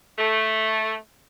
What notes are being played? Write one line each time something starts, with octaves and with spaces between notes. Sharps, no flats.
A3